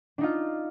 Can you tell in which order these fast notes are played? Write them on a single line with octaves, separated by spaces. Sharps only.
D4 D#4 F4